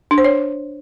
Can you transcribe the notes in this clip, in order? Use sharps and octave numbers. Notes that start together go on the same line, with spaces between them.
D4
C5
C#5